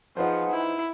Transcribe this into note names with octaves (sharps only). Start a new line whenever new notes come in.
F3 D#4 G#4 B4 C5 F#5
E4